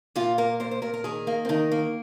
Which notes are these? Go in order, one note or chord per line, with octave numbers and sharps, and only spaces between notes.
A#2 F4
A#3 A#4
A#2 C5
C5
A#2 A#4
A#4
D#3 G#4
A#3
C4
D#3 D#4
A#3